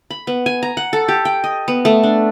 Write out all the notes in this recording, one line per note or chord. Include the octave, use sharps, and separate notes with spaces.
B5
B3
G#5
A#5
F#5
A4
G4
G5
D#5
B3
A3
D4